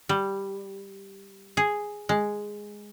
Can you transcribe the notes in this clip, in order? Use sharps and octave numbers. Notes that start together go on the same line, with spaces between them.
G3
G#4
G#3